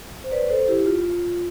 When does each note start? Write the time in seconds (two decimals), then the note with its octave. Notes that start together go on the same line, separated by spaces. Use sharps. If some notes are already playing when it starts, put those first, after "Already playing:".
0.24 C5
0.32 B4 D5
0.50 A4 C5
0.68 E4 G4
0.86 F4